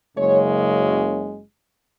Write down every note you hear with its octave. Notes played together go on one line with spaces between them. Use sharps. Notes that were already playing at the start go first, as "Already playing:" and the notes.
F#1 F#2 C#3 G#3 C#5